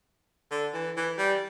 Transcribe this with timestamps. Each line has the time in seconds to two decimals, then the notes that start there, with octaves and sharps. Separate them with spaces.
0.51 D3
0.74 E3
0.97 E3
1.18 G3